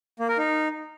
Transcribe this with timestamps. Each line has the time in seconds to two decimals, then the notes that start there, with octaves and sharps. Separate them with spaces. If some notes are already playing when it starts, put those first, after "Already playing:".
0.20 A#3
0.29 A#4
0.38 D#4